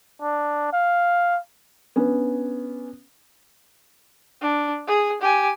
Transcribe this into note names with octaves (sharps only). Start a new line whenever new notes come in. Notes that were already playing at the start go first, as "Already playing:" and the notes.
D4
F5
B3 C#4 D4
D4
G#4
G4 G#5